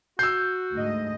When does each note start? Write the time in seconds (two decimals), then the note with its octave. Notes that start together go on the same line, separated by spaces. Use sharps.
0.19 F#4 E6 G6 C7
0.73 D2 G#2 D#5